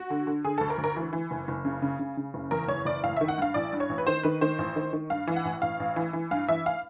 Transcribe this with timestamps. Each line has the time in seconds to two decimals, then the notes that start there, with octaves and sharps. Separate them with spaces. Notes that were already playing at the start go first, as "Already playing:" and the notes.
Already playing: F#4
0.10 D3
0.27 D3
0.44 D3 G#4
0.58 D2 A4
0.70 A#4
0.78 D2
0.84 A#4
0.96 E3
1.13 E3
1.31 F#1
1.48 F#1
1.65 C#3
1.82 C#3
1.99 C#3
2.17 C#3
2.34 F#1
2.51 E2 A#4
2.68 F#1 C#5
2.85 F#1 D5
3.03 A1 F5
3.17 E5
3.21 D#3
3.28 F#5
3.38 G2 F5
3.54 A1 D5
3.73 G2
3.80 C#5
3.89 A1
3.98 B4
4.07 D#3 C5
4.23 D#3 B4
4.41 D#3 C5
4.59 A1
4.76 D#3
4.93 D#3
5.10 G2 F5
5.27 E3
5.36 F#5
5.45 A1
5.62 A1 F5
5.80 A1
5.96 E3
6.13 E3
6.31 G2 F5
6.49 E3 E5
6.66 F5